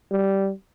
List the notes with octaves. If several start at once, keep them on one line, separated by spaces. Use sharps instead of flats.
G3